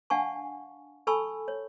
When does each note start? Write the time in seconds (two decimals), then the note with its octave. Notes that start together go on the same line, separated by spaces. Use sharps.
0.10 D4 F5 F#5 G#5 A5 C#6
1.07 A4 G#5 A5 B5 C#6 E6
1.48 C#5